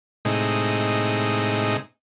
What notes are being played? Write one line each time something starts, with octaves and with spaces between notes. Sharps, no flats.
A2 C3 G#3 D#4